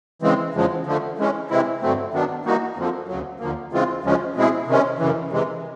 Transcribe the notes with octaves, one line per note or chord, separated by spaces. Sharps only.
C#3 E3 G#3 C4
E2 C#3 F3 G#3
D3 F3 A3
E3 G#3 C#4
C3 E3 G#3 C4 E4
G2 D3 F#3 A3 C4
D#3 F#3 B3 D4
E3 G3 A#3 D#4 F#4
F2 D3 F3
D2 C#3 F#3
D#2 D3 F3 A#3
C#3 E3 G#3 C4 F4
D2 C#3 F3 G#3 C#4
B2 G#3 C4 E4 G#4
C3 D#3 G#3 C#4
F#2 C#3 E3
C3 E3 G#3